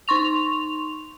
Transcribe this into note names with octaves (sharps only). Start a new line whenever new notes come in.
D#4 C6 C#6 F7